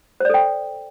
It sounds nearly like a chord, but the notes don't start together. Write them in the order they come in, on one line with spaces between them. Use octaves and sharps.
C5 D5 A4 G5